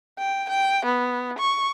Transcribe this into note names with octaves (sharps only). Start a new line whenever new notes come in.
G5
G5
B3
C#6